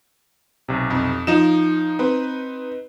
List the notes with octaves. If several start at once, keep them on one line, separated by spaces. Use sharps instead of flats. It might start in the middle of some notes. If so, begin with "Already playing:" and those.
B1 C3
F2
F3 D#4 F4 E7
C4 B4